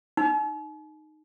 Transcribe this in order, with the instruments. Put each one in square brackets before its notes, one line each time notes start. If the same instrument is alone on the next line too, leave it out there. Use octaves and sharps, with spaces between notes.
[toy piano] D#4